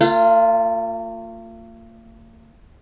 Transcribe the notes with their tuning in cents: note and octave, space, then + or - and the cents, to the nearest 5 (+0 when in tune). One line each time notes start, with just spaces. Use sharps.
A#3 -45 F4 +0